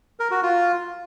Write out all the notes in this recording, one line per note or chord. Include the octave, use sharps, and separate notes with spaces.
A#4
F#4
F4